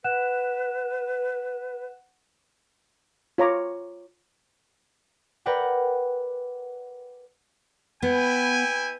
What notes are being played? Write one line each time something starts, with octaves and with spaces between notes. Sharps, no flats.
B4 F#5 F#6 E7
F4 C#5 A#5 D6
A#4 B4 D5 F#5 G5
B3 E4 G5 G#5